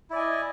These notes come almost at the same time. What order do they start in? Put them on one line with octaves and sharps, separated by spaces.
E4 D5 G#5 D#5